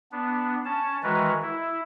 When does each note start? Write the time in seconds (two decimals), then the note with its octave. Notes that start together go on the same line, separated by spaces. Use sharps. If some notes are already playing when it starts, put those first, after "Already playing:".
0.12 B3 D4
0.65 C#4 A5
1.03 D#3 E3 G#3 F#4 A#4 B4
1.42 E4